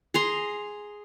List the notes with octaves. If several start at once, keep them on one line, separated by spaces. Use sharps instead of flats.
G#4 A#5 C6